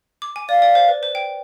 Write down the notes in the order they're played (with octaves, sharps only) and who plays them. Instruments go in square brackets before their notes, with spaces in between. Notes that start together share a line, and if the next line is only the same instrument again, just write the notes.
[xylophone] D6
G#5
[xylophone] D5 [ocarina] F5
[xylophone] D5
C5
B4
C5
G5